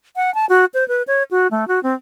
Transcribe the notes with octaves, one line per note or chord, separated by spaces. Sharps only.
F#5
A5
F#4
C5
B4
C#5
F#4
A3
F#4
C4